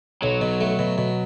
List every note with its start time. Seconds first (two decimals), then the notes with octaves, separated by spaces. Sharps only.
0.22 B1 F#3
0.41 B2
0.60 A3
0.79 B2
0.98 B2